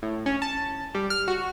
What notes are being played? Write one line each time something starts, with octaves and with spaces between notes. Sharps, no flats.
A2
C#4
A5
G3
F6
F#4